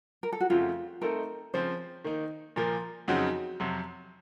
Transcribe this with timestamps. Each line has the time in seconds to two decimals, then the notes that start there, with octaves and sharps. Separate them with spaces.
0.23 A#4
0.33 A4
0.40 F#4
0.50 F2 C#3 A3 C4 F4
1.02 A3 C4 D#4 A4 A#4 D#5
1.54 C#3 F3 C4 C5
2.04 D#3 A#3 D#4
2.56 A#2 F3 A#3 A#4
3.08 F2 C#3 F#3 C4 D#4 F#4
3.60 F2 C3 F#3